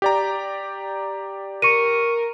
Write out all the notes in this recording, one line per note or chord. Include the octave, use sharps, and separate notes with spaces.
G4 D5 A#5
A#4 C#6 C#7 D#7